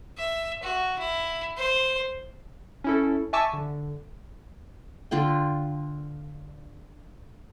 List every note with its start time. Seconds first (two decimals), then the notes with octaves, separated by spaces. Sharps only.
0.18 E5
0.63 F#4
0.99 E4
1.57 C5
2.84 C#4 E4 A4
3.33 E5 G#5 A5 C#6 D6 E6
3.53 D3
5.11 D3 F4 D5 G5